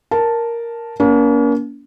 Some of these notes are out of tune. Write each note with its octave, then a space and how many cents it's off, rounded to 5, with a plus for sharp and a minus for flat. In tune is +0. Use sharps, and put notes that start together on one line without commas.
A#4 +0 A5 +0
A#3 +25 C#4 +45